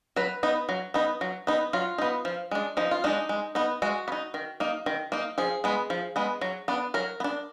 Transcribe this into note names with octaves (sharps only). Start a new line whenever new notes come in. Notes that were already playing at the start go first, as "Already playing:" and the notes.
F#3 B4
B3 D#4
F#3
B3 D#4
F#3
B3 D#4
F#3 F4
B3 D#4
F3
G#3 D4
F3 D#4
F4
G#3 D4 D#4
G#3
B3 D#4
G#3 F#4
B3
D#4
D#3
A#3 D#4
D#3
A#3 D#4
F3 G#4
G#3 B3
F3
G#3 B3
F#3
B3 D4
F#3 A#4
B3
D4